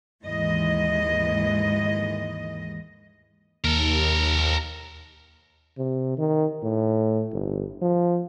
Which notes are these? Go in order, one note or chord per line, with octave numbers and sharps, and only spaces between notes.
D#2 G#2 E3 G#3 D#5
D#2 A4 A#4
C3
D#3
A2
G1
F3